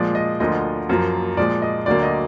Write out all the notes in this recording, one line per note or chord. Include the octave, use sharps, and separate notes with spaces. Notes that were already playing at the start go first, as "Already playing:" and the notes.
Already playing: A#2 F3 G#3 D5
D#5
D2 D3 F3 A#3 D#5
F#2 F3 A#3
A#2 F3 G#3 D5
D#5
D2 D3 F#3 A#3 D5
D#5